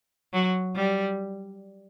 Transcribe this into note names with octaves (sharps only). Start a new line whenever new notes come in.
F#3
G3